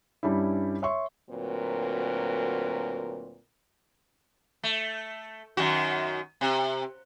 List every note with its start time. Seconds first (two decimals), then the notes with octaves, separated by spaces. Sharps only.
0.23 G2 G3 C#4 E4
0.82 C#5 E5 C6 C#6
1.30 D2 A#2 F#3 C4 A#4 B4
4.63 A3
5.57 F#2 D#3 F#4
6.41 C3